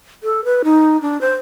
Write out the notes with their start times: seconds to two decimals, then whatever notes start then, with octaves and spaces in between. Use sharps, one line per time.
0.23 A4
0.45 B4
0.64 D#4
1.01 D4
1.21 C5